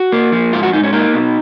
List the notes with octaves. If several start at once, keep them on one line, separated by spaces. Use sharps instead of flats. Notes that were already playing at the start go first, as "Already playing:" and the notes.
Already playing: F#4
A#3
F3
G#2 F4
F#4
G#2 D#4
C#4
A#3 D#4
B2